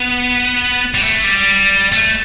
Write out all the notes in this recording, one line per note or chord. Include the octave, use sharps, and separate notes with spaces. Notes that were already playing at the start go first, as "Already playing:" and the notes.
Already playing: B3
G3
A3
G3
A3